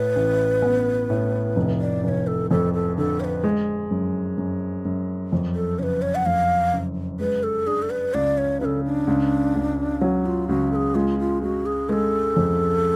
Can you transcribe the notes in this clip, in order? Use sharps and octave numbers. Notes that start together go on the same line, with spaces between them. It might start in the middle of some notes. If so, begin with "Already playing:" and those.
Already playing: A2 B4
A1
B3
A2
F1
D5
F1 C#5 D5
A4
F2 A4
A4
D3 A4
C#5
B4
G#3
F#2
F#2
F#2
F2
A4
F#1 B4 C#5
C#5
F#5
F2 F5
F#1
G#3 B4
A4
D4 G#4
A4
B4
C#2 D5
C#5
C#3 A4 B4
D4
C#2
C#2
F#3 C#4
F4
C#2 F#4
A4
G#4
G#3 F4
F4
G#3 F#4
G#4
G#3 A4 B4
F2